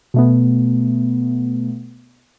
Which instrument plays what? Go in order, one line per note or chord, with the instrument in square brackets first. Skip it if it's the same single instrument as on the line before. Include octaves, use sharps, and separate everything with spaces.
[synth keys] B2 A3 B3